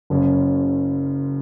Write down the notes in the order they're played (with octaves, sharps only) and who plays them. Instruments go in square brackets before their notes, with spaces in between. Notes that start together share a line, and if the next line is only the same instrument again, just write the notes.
[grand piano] F#1 F#2 C#3